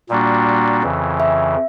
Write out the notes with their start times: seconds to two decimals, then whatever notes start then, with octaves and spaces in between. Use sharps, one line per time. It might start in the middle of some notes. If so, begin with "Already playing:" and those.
0.09 A#2 G3 A#3 D4 F#4
0.83 F2 C#3 E3
1.20 E5